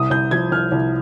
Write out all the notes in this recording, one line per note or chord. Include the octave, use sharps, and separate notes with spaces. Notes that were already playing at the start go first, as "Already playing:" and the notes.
Already playing: C2 D#6
C2 G6
F3 G#6
C2 F6
C2